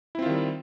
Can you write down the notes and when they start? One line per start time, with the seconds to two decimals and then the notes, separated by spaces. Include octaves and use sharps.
0.15 E4
0.19 C4
0.22 F4
0.26 D#3
0.30 G3